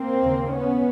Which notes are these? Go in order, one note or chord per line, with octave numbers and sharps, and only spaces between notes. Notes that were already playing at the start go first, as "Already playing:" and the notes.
Already playing: A#3 C4
D#2 C#3
B3 C#4